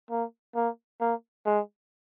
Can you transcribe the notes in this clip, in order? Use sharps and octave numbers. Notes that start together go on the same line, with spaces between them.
A#3
A#3
A#3
G#3